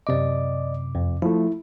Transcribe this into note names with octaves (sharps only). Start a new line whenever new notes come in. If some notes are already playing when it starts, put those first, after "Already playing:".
F#2 C3 D5 D#5 D6
F2
F3 A3 E4